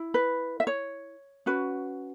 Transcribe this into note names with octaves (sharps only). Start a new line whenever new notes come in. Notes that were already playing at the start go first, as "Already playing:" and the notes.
Already playing: E4
B4
E5
C#5
C#4 F#4 B4